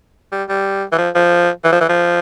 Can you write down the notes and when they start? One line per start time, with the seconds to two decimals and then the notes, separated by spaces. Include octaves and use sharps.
0.32 G3
0.49 G3
0.93 E3
0.98 F3
1.15 F3
1.64 E3
1.72 F3
1.81 E3
1.89 F3